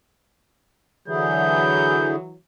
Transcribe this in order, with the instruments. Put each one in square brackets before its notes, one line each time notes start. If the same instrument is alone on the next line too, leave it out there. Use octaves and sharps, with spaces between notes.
[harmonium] D3 E4 G#4 [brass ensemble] E3 F#3 [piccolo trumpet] G6